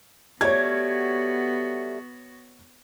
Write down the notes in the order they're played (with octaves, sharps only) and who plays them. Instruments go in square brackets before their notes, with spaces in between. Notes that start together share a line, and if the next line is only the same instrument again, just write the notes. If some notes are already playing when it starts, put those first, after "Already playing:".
[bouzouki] G3 A3 [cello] B3 F#4 [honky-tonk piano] C#5 G#6